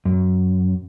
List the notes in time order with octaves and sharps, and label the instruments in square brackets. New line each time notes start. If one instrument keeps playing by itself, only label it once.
[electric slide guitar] F#2